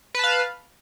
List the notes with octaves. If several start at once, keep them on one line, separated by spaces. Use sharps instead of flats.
B4 F5 A5